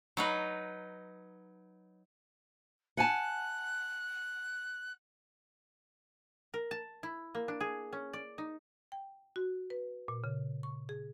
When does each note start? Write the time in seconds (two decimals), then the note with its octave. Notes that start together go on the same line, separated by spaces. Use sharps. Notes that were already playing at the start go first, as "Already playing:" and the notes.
0.17 F#3 D#4 B4
2.97 F#5 G#5 A5 F#6
6.54 A#4
6.71 A5
7.03 E4
7.35 A#3
7.48 D4
7.61 G#4
7.93 C#4
8.13 D5
8.38 D#4
8.92 G5
9.36 F#4
9.70 B4
10.08 A#2
10.24 C#3
10.63 C#6
10.89 G#4